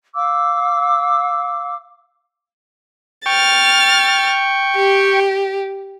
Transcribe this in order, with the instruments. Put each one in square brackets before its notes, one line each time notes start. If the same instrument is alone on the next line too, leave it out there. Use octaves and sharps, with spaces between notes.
[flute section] F5 D6 E6
[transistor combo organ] G5 C#6 [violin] F6 A6
[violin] G4